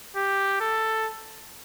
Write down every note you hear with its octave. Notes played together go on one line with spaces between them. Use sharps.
G4
A4